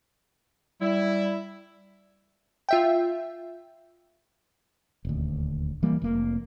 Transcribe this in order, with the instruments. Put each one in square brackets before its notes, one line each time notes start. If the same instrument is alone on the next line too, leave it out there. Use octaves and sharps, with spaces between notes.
[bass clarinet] G3 [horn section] E4
[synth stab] F4 E5 G5
[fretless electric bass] D#1 D2
E3 G3 A#3
F1 A#3